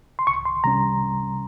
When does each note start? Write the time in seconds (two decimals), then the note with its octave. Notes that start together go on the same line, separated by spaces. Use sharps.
0.19 C6
0.27 C2 C#6
0.45 C6
0.64 C3 G3 C#4 A#5